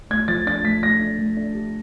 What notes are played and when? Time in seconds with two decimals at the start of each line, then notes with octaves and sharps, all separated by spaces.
0.11 A3 G#6
0.28 F3 A6
0.47 D4 A6
0.65 A3 B6
0.83 A3 A#6
1.01 D4
1.19 A3
1.37 D4
1.55 G4